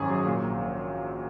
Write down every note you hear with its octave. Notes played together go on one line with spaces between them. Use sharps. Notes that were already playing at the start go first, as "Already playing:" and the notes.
Already playing: G#1 F#2 C#4 G#4
F#3
A#2
A#1
A#1